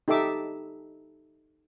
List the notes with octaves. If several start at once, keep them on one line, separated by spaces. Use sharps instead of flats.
D#4 G4 A4 E5 D6